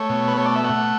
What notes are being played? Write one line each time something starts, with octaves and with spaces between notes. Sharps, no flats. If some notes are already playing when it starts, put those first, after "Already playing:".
Already playing: A3 C#5
B2
B4
A3 C#5
D5
E5
A3 F#5